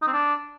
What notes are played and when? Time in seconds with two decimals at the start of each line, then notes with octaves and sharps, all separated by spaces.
0.02 D#4
0.07 C4
0.13 D4